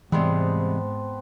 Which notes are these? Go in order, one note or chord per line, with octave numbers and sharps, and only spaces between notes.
G#2 C3 E3 G3 G#3 B3 C4 A5